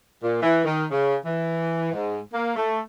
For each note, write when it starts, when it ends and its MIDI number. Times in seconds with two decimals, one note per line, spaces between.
0.24 0.40 46
0.43 0.63 52
0.65 0.85 51
0.91 1.16 49
1.25 1.90 52
1.93 2.20 44
2.34 2.54 58
2.56 2.81 57